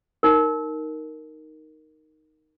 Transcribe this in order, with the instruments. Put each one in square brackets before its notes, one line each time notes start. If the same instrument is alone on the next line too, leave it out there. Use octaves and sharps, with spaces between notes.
[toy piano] D#4 A#4